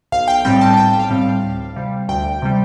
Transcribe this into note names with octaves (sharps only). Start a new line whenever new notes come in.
B1 F5
G5
A2 G3 C4 G5
A5
B1 G5
F5
A2 G3 C4
F5
D2
C3 G3
D2 G5
C3 G3